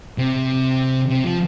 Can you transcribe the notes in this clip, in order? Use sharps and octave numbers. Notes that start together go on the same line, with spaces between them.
C3
C3
F3